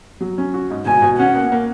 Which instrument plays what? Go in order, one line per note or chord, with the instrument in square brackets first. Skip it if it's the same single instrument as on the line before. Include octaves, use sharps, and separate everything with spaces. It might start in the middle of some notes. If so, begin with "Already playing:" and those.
[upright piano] F#3
C#4
F#4
G#2
[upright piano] B2 [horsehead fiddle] G#5
[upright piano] B2
[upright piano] C#4 [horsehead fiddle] F#5
[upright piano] A#3
A#3